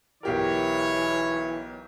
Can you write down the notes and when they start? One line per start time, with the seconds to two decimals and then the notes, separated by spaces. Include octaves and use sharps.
0.23 B1 E3 G4 A#4 C#5